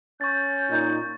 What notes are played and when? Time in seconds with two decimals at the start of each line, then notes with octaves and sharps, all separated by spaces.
0.21 C#4 C#6 G6 A6
0.70 A#2 D#4